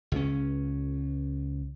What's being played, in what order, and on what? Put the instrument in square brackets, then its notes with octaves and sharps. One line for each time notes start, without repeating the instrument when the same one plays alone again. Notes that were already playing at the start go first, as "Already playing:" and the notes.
[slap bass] C#2 C#4